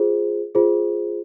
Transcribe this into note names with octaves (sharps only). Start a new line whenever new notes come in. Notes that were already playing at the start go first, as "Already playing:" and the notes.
Already playing: F4 G#4 C5
F4 G#4 C5